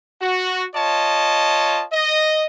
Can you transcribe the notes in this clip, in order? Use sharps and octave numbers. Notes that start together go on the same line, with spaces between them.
F#4
F4 C#5 D#5 A5
D#5